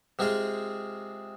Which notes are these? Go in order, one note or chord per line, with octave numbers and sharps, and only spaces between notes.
C3 G#3 C4 F4 G#4